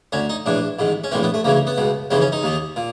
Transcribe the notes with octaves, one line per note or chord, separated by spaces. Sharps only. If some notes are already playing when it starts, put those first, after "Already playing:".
D2 D3 C#4
D#4
A#1 A2 E3 D4
A1 G#2 D#3
C#4
A#1 A2 E3 C4
B3
A3
D2 C#3 E3 A#3
B3
C#2 B2
D#2 C#3 E3 C4
C#4
D#4
D#2 D#3
A#2